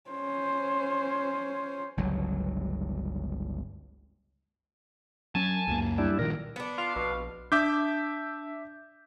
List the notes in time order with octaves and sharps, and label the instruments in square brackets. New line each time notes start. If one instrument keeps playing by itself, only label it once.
[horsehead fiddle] C#4 C5
[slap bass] G1 C#2 F#3
[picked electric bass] F#3 C#4 [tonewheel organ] G#5 A5
[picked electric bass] C#2 F#2 A#3
[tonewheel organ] G3 D4 E4
[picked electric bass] A#2 D#3 F3 [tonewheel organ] A#4
[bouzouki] B3 D4
[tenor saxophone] F4 [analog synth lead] F5
[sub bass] A#1 [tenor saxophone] B2
[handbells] D4 [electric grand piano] E5 D6 G6